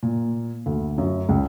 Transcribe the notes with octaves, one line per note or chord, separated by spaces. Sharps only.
A#2
D2
F#2
C#2